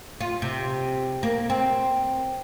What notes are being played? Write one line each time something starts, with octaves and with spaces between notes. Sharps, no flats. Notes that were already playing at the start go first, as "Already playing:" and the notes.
F4
C3
A#3
C4